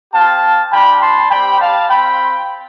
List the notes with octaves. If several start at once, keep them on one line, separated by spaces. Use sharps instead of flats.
C4 G4 F5 A5
G3 D4 F4 G5 B5
A5 C6
G3 C4 G4 G5 B5
F5 A5
C4 F4 G5 B5